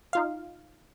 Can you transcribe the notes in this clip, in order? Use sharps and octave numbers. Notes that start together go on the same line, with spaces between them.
D#4 F4 F5